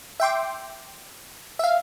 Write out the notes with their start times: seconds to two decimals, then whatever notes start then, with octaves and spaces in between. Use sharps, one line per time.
0.20 E5 G5 C6 D6
1.59 E5 F5